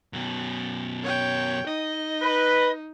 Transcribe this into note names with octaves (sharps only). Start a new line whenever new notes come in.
F#2 B2
C#5 G5
D#4 D#5
B4